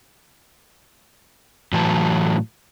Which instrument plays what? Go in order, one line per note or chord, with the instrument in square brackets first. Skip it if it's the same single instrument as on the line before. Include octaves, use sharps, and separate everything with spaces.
[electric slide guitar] A2 E3 F#3 A5